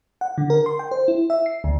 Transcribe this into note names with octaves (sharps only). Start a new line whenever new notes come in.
F#5
D3
A#4
C6
G5
C5
E4
E5
C7
D2